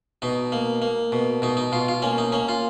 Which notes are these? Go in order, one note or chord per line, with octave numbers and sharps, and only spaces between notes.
B2 D#4
A#3
A#3
B2
B2 D#4
D#4
B2 F4
F4
A#3 C#4
D#4
A#3 C#4
F4